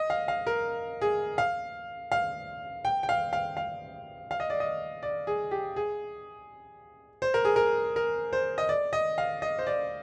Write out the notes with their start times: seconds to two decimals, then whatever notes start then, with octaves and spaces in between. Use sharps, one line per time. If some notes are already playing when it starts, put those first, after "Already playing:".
Already playing: D#5
0.10 F5
0.28 F5
0.47 A#4
1.02 G#4
1.38 F5
2.12 F5
2.85 G5
3.03 G5
3.09 F5
3.33 F5
3.57 F5
4.31 F5
4.40 D#5
4.50 D5
4.60 D#5
5.03 D5
5.27 G#4
5.51 G4
5.76 G#4
7.22 C5
7.34 A#4
7.45 G#4
7.56 A#4
7.96 A#4
8.33 C5
8.58 D#5
8.69 D5
8.93 D#5
9.18 F5
9.42 D#5
9.59 C5
9.67 D5